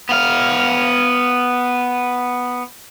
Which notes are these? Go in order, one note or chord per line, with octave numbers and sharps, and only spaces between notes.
B3 F5